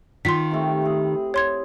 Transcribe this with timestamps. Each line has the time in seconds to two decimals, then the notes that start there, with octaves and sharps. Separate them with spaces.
0.25 D#3 F4 C6 B6
0.51 C3 A3
0.82 E4 G#4
1.34 C#5 C6 G#6